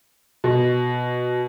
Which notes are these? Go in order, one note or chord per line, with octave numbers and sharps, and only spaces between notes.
B2